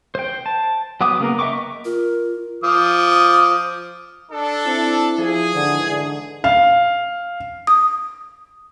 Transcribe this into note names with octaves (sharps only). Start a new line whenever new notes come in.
C5 G5
A5
F#3 B3 F#5 D6 D#6
C#3 A#3 B3 A#4
D#5 E5 G5 C#6 D6
F4 A#4
F3 D6 D#6
D4 A4
C4 E4
F3 G#4
G#2 D3 E3
D3
F5
D#6